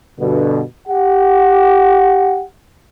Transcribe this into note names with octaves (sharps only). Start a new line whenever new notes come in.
G2 B2 D3
G4 F#5